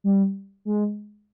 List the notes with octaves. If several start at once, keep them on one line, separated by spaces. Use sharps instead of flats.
G3
G#3